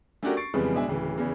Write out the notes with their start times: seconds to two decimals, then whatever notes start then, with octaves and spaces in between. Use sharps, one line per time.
0.23 A3 C#4 D4 F#4 G4 A#4
0.37 C#6 A6 C7 D7
0.54 F2 C#3 E3 G3 G#3 B3
0.75 B2 G#3 D4 E5 G#5
0.88 D1 C#3 E3
1.15 E2 C#3 E3